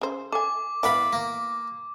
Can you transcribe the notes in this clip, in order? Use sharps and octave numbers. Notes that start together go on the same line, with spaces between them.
C#3 C5
A4 G#5 D6
E3 B3 D5 F5 F#5 B5
A#3